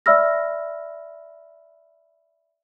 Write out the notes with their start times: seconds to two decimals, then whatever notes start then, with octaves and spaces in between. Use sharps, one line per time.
0.06 D5 E5 B5 E6 F6 A#6